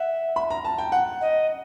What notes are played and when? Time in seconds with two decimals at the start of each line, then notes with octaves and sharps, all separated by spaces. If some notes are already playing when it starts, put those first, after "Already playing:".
Already playing: E5 F#5
0.36 B5
0.50 A#5
0.65 A5
0.78 G5
0.92 F#5
1.21 D#5